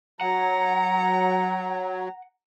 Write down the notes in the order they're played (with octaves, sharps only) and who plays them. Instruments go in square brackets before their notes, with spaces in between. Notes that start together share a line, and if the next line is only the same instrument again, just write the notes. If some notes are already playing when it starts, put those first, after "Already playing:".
[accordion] F#3 [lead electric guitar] F#5 [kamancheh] A#5